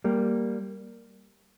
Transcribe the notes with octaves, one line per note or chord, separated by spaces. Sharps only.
G3 A#3